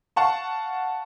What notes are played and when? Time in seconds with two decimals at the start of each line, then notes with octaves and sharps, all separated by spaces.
0.16 F5 F#5 A5 C#6